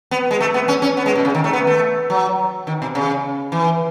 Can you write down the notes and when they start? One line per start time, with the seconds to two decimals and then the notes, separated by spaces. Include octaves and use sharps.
0.11 B3
0.31 G#3
0.41 A3
0.54 B3
0.68 C#4
0.82 C#4
0.97 B3
1.06 G#3
1.15 B2
1.25 C#3
1.35 D#3
1.44 A3
1.53 B3
1.67 A3
2.10 F#3
2.67 D#3
2.82 B2
2.95 C#3
3.52 E3